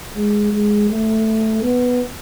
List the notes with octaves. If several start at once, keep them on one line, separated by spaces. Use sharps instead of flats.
G#3
G#3
A3
B3